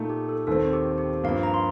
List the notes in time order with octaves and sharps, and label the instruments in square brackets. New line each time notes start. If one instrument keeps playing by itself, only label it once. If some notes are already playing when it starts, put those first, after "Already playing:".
Already playing: [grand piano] A#2 A3 D#4
[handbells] G4
A4
[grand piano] D#2 D#3 A3 C4 [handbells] A4
[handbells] G4
G4
[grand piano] G2 F3 A#3 [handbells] F5
[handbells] A#5
C6